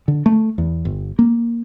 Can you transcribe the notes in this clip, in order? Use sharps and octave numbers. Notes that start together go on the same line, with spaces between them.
D3
A3
E2
G1
A#3